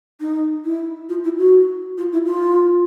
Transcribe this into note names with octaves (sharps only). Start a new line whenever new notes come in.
D#4
E4
F4
E4
F#4
F4
E4
F4